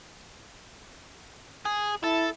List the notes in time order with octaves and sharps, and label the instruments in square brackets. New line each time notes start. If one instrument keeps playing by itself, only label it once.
[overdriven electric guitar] G#4
[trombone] E4 [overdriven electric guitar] A4